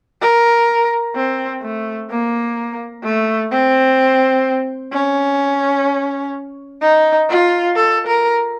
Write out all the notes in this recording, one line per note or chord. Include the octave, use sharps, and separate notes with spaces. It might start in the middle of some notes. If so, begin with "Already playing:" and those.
A#4
C4
A3
A#3
A3
C4
C#4
D#4
F4
A4
A#4